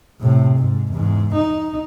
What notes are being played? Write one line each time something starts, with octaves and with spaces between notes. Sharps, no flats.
A2 C3
G#2
E2 G#2
D#4